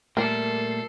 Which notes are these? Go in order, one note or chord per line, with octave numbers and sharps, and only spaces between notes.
A#2 G3 A3 A4 A#4 C7